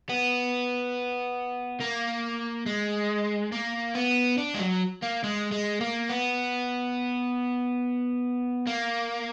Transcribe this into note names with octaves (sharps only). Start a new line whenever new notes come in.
B3
A#3
G#3
A#3
B3
D4
G#3
F#3
A#3
G#3
G#3
A#3
B3
A#3